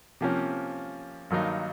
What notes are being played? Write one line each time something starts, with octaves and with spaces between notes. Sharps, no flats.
C3 F3 A#3 C#4
G2 D#3 F#3 A#3 D#4